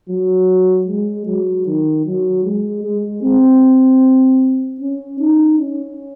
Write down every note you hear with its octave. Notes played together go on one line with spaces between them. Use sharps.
F#3
G#3
F#3
D#3
F#3
G#3
G#3
C4
C#4
D#4
C#4